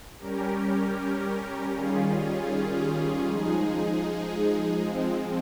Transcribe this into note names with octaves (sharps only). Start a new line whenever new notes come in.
G3 C#4 G4 A#4
D#3 G3 C#4 F4 G#4
F3 G#3 D#4 G#4
F3 G#3 C4